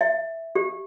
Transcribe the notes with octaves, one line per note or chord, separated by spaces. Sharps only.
E5
G4